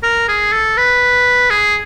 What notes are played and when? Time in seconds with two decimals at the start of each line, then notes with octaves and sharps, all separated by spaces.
0.03 A#4
0.28 G#4
0.52 A4
0.77 B4
1.50 G#4